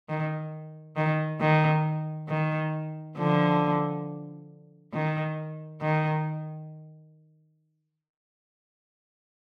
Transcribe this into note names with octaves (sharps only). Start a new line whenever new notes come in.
D#3
D#3
D#3
D#3
D3 F3
D#3
D#3